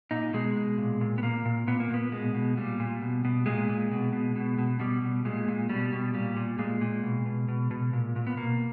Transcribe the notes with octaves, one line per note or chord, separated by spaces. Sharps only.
A#2 D#4
B2 G#3
B2
A#2
A#2
B3
A#2 A#3
A#2
A#2 B3
A#3
A#2 B3
B2 G#3
B2
A#2 G3
A#2
B2
B2
A#2 G#3
A#2
B2
B2
B2
B2
B2 G3
B2
A#2 G#3
A#2
B2 G3
B2
A#2 G3
A#2
A#2 G#3
A#2
B2
B2
B2
B2
A#2
A#2
B3
B2 A#3